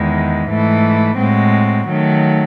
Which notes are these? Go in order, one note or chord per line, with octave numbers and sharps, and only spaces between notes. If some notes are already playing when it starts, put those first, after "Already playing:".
Already playing: E2 D#3 G#3
G#2 E3 A3
A2 G#3 C4 F#4
D#3 F#3 A3